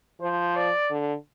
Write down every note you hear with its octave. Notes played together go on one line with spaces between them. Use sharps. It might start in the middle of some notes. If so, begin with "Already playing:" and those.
F3 C5
D5
D3